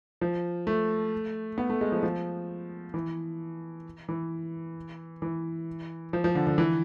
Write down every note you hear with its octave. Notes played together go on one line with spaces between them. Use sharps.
F3
A3
B3
A3
G#3
F3
F3
E3
E3
E3
F3
F3
D3
D3
E3